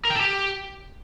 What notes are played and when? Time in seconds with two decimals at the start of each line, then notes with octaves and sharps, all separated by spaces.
0.05 A#4
0.10 G5
0.15 A4
0.21 G4